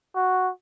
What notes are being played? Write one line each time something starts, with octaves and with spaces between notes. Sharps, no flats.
F#4